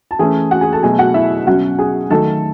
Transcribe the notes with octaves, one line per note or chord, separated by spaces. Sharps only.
A5
E3 A3 C#4 G#4 G#5
F#4 F#5
G#4 G#5
A4 A5
B2 F#3 A3 G#4 G#5
F#4 F#5
E4 E5
B2 F#3 C#4 F#4 F#5
G#4 G#5
D#3 F#3 A3 A4 A5